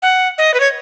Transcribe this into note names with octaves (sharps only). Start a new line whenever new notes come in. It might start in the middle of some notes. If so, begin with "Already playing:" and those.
F#5
D#5
B4
C#5